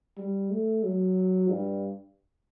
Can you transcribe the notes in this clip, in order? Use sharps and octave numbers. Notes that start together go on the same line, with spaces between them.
G3
A3
F#3
G2